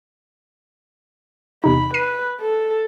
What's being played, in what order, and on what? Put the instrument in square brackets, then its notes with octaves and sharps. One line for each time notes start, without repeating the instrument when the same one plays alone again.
[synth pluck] E2 C3 D#4 [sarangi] B5
[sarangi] B4 [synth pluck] C7 D#7
[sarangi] A4